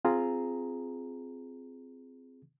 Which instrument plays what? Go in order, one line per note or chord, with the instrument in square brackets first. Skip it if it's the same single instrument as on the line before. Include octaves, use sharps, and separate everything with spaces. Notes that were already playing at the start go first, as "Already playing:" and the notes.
[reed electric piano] C4 F4 G#4 A#5